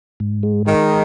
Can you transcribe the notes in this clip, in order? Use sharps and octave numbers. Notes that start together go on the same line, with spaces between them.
G#2
G#3
D#3 G#3